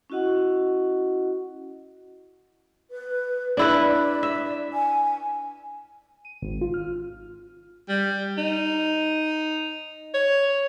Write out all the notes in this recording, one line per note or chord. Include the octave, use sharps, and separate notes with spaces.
C#4 E4 F#4 D#5 F#5
B4
D4 E4 B4 D5
E5
G#5
D#7
G#1
F4
F6
G3
D#4
C#5